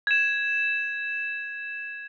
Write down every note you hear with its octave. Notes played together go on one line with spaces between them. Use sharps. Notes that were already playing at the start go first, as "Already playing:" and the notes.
G#6 E7